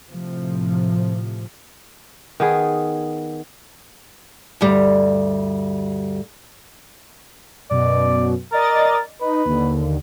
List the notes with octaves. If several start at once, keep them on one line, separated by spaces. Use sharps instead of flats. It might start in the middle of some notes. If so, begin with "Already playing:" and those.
A2 C3 F3
D#3 B3 G#4
D2 G2 G3
F#2 B2 D5
A#4 D5 D#5 A6
D#4 B4
D#2 D3